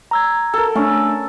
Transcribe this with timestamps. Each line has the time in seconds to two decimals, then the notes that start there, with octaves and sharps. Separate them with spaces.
0.11 A#5 E6 G#6
0.54 A4 A#4
0.75 A3 C#4 D4